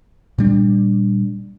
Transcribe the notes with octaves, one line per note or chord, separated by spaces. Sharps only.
A#2 G3 D4